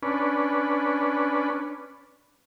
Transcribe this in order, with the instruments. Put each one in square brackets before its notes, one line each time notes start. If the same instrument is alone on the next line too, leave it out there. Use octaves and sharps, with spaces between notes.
[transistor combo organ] C#4 D4 B4